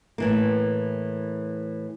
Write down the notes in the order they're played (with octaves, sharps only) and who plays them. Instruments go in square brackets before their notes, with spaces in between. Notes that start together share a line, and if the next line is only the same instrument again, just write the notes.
[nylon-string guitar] A2 E3 A#3